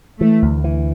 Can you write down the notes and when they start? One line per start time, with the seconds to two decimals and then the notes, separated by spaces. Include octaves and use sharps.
0.20 E3 A3
0.42 D2
0.64 E3